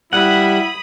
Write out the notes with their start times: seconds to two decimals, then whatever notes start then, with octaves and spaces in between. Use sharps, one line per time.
0.13 G3 E4 F#5 B5 D#6